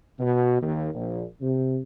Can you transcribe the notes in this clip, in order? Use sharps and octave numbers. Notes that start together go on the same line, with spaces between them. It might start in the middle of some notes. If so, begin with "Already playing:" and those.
B2
D#2
A#1
C3